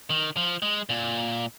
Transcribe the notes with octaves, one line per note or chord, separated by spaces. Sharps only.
D#3
F3
G#3
A#2